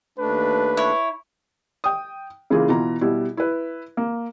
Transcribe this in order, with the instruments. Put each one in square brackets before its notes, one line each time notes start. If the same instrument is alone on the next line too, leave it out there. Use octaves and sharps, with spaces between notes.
[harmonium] D#2 A3 D4 [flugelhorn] B4
[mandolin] E4 C#5
[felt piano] G5 D#6
C#3 E3 A#3 F4 G#4
B2 E3 F4 A#5
B2 G3 E4
E4 B4
A#3